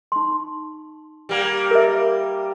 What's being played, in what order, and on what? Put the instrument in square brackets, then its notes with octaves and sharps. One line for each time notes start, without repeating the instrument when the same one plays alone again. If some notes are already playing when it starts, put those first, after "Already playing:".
[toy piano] D#4 C6
[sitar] G3 A#3
[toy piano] A#4 E5